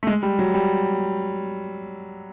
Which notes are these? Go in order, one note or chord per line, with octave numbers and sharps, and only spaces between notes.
A3
G#3
G3
F#3
G3